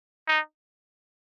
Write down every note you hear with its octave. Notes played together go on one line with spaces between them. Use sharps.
D#4